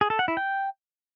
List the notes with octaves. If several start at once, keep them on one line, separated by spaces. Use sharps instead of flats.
G#4
A4
F#5
E4
G5